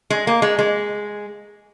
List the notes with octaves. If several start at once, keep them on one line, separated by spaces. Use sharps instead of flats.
G#3
A#3
G#3
G#3